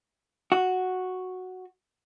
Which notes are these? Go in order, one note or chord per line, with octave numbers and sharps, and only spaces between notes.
F#4